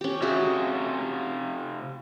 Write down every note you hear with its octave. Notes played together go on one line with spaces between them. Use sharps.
C#4 G4
C3 C#4 F4 F#4 G#4 E5